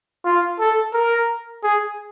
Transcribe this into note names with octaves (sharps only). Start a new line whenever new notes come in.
F4
A4
A#4
G#4